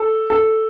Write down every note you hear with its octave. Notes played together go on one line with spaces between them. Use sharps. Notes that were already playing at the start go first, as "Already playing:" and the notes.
Already playing: A4
A4